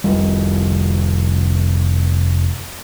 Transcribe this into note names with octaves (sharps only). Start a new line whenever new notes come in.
F1 G3